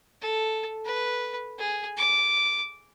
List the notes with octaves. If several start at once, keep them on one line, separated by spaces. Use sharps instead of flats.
A4
B4
G#4
D6